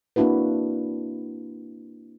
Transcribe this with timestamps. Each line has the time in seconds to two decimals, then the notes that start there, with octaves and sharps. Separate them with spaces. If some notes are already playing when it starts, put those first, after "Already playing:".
0.16 A#3 C4 D4 E4 F#4 B4